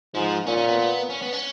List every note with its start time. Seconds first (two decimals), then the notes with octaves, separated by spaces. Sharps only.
0.14 G#2 F3
0.46 A#2 C#4
0.57 C#4
0.68 B3
0.79 B3
1.10 C#4
1.22 B3
1.33 C#4